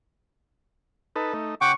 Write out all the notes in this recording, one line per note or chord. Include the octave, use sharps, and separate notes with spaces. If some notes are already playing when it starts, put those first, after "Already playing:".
D#4 A4 B4
A3 D#4
C#3 F#5 G5 C#6 D6